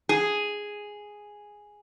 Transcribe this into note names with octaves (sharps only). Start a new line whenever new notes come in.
G#4